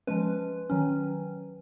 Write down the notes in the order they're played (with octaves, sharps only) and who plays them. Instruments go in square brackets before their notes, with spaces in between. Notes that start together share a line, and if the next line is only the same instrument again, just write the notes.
[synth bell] F3 G#3 C#4 B4
D#3 F#3 C#4